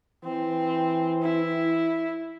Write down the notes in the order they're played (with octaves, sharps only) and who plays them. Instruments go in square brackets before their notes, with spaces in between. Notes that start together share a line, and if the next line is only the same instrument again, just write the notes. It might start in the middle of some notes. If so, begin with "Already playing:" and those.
[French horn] E3 [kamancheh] C4
[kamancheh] E4